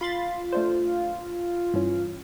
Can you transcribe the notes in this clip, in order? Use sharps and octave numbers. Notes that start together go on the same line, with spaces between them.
F4 B5 C6 A6
A3 D4 C5
G2 E3 C#4